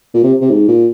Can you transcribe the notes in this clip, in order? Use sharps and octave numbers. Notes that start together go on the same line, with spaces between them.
A#2
C3
C3
G#2
A#2